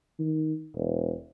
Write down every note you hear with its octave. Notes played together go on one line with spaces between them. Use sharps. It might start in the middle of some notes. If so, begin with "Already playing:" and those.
D#3
E1